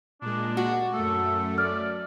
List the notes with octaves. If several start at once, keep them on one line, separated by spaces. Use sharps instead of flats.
A#2 G#3 D4
F#4
F#2 A3 A4
D5 F6